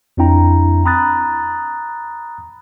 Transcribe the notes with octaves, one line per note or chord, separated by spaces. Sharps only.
F2 C4 D4 E4 G5 A#5
A#5 B5 D#6 F#6 A6